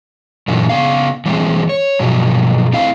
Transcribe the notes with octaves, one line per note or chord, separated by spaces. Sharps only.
F#2 A#2 D3 E3 F#3
C#3 E3 B3 F5
E3 G3 G#3 C4
C#5
G2 B2 F3 F#3
A3 C4 E4 F5